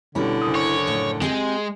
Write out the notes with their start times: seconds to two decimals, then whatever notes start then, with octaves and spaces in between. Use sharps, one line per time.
0.15 B2 D3 G3 C#4 E4 A#5
0.42 F#1 D#6
0.55 C#5
0.87 A2 F3
1.22 G#3 C4 G4 G#4